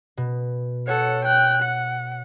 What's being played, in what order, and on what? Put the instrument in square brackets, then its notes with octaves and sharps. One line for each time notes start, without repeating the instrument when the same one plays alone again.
[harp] B2
[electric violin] A4 F#5 [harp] C#5
[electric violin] G5 F#6
F#5